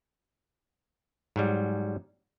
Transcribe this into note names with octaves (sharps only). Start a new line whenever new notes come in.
G#2 F#3 G3